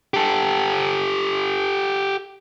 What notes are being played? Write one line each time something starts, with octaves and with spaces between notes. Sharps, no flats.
G4 A4